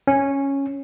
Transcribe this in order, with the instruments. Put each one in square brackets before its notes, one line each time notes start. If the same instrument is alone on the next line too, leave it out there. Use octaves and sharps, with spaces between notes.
[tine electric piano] C#4